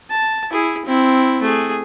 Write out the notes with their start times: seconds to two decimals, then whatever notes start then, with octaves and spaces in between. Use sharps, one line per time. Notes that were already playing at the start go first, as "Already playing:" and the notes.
0.11 A5
0.51 E4 G#4
0.86 C4 E4
1.43 A3 G#4